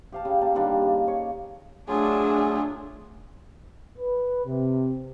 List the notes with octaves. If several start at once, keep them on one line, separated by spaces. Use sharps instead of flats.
G4 F5 A5
C#3
A#3 A5
D3 D#3 G3 D4
C#3
C#5
F#3 A3 D4 F4 G#4
B4
C3